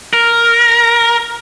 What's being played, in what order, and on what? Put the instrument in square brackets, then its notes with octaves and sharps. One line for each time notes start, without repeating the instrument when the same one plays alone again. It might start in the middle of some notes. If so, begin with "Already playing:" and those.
[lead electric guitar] A#4